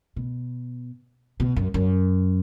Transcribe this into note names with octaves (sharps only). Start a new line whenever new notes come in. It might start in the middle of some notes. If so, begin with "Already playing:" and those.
B2
B2
F#2
F#2